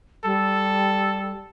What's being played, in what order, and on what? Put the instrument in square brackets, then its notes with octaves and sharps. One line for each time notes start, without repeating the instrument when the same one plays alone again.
[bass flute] G3 [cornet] A4